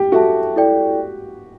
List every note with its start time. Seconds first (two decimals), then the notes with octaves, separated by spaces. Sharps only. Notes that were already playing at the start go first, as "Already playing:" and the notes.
Already playing: G4
0.12 F#4 A4 E5 A5
0.56 E4 A4 D5 G5